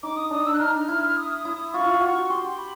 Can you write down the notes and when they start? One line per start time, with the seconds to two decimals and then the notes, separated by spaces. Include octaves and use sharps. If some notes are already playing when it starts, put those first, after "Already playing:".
0.03 D#4 D6
0.17 D#6
0.31 D4 D#6
0.46 D4 E6
0.53 F#6
0.59 D#4 F6
0.88 E4
1.17 D#6
1.45 E4
1.73 F4 C#6
1.81 E4
1.89 F4
2.01 F#4
2.30 G4 C6
2.58 B5